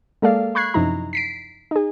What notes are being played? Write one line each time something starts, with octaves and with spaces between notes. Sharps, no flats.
G#3 A#3 A4 A#4 D5 F5
B5 C#6 F#6 G#6 C7
F#2 C3 F3 D#4 E4 A#5
B6 C7 D7
D#4 G#4